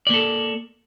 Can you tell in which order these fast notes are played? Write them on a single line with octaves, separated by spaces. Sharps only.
D5 A#3 A4